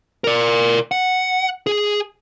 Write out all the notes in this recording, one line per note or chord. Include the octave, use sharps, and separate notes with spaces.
A#4 D5
F#5
G#4